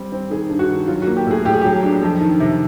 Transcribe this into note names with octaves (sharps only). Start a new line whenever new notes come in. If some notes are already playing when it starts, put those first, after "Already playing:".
Already playing: G3 C4
C4
D#3 G#4
G2
F#4
D#3
F#3 F4
F#4
A#3
G4
A2 G#4
A2 G4
G#4
F#3 G4
D4
F2
D#3
C3